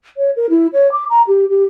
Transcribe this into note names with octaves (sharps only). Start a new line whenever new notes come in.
C#5
A#4
E4
C#5
D6
A#5
G4
G4